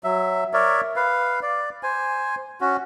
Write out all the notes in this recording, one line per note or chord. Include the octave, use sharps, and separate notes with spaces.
F#3 E5
A#4 C#5 D5 E5
B4 F5
D5
C5 G#5
C#4 F#4